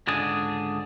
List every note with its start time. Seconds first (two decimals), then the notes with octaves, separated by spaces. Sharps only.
0.07 C#2 G#2 D3 D4 G#4